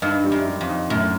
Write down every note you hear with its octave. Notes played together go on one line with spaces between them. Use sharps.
G2 D#4
G3
F#2
G3
F2
D#4
F#2 A2